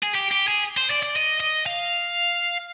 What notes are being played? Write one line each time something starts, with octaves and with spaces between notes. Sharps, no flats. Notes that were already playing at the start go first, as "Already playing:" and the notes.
G#4
G4
G4
G#4
C5
D5
D5
D#5
D#5
F5